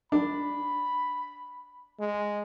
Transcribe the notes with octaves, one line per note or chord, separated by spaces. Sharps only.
D4 B5
G#3